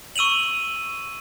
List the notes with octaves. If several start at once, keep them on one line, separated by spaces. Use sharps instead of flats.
C#6 E6 D#7 F7 F#7